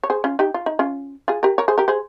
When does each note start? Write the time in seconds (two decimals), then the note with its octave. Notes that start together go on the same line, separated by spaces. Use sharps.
0.04 C#5
0.10 G#4 C5
0.24 C#4 F4
0.39 D#4 G4
0.54 F4
0.66 D#4
0.79 C#4 F4
1.28 F4 G#4
1.43 G4 A#4
1.58 A#4 C#5
1.68 G#4 C5
1.78 G4 A#4
1.88 G#4 C5